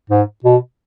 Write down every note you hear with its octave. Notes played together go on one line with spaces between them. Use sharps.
G#2
B2